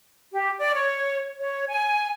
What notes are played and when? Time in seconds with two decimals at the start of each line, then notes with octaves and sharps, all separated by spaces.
0.33 G4
0.58 D5
0.74 C#5
1.40 C#5
1.69 G#5